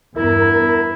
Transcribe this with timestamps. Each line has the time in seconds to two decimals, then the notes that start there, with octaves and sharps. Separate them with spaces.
0.16 E2 G2 B3 E4 A#4